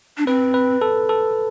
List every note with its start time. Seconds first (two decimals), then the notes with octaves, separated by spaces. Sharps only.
0.18 D4
0.27 C4 B4
0.54 B4
0.82 A4
1.09 A4